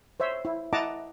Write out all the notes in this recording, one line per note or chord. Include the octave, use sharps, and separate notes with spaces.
C5 C#5 E5
E4
E4 D#5 F#5 A5 A#5 D6